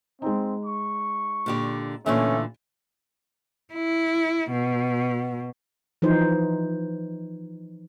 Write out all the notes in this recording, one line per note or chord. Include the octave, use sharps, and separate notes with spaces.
G#3 C4 D#4
C#6
A#2 D3 G4
A#2 D3 E3 A3 C#4
E4
B2
E3 F3 D#4 C5